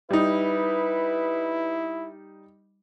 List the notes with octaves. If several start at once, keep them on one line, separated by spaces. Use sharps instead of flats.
G3 D#4 E4 B4